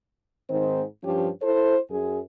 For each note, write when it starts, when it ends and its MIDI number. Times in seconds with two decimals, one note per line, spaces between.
0.50 0.83 44
0.50 0.83 51
0.50 0.83 60
0.50 0.83 63
0.50 0.83 72
1.04 1.29 43
1.04 1.29 53
1.04 1.29 61
1.04 1.29 67
1.42 1.77 64
1.42 1.77 69
1.42 1.77 72
1.91 2.20 42
1.91 2.20 68